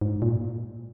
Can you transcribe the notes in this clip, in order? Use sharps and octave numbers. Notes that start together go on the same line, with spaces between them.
G#2
A#2